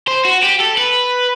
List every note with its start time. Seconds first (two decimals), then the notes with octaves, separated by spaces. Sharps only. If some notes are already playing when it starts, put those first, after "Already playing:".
0.08 C5
0.25 F#4
0.43 G4
0.60 A4
0.77 B4